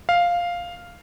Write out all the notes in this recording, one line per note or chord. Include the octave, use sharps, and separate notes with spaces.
F5